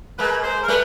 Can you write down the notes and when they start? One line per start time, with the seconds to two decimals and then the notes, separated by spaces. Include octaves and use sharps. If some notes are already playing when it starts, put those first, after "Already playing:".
0.19 G#3 A#3 B4
0.44 C5
0.64 A#4
0.68 G3 A3 B4